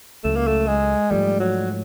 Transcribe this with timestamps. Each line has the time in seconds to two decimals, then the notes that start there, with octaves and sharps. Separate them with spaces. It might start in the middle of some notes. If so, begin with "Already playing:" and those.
0.24 C#2 C#3 F#3 A3
0.36 A#3
0.47 A3
0.68 G#3
1.11 G#2 F3 G3 A3
1.40 F#3